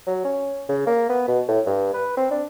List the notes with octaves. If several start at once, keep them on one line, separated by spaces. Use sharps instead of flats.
F#3
C#4
C#3
A#3
B3
B2
A2
G2
B4
C4
D4